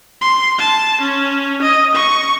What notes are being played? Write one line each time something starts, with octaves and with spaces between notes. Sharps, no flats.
C6
A5
C#4
D#5
C#6